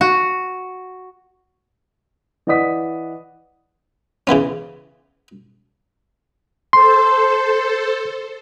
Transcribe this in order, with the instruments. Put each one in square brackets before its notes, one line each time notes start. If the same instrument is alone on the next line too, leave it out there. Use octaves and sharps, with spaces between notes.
[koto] F#4
[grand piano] E3 D5 D#5 F#5 D#6 B6
[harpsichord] C#3 E3 B3 C#4
[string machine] A4 C5 [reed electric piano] C6